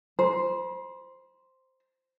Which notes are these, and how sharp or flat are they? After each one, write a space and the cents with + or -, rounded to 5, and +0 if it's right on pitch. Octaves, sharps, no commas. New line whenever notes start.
C5 +0 B5 -45